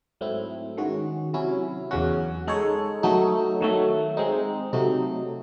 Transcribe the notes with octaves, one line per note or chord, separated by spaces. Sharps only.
G#2 F#3 A3 C4 E4
D#3 G#3 C#4 F#4
C3 F#3 C#4 E4
E2 C#3 F#3 C#4 F#4
G#3 D#4 A4 C#5
F#3 A3 D#4
D#3 F#3 A3
G#3 C4 D#4
C3 F#3 A3 D#4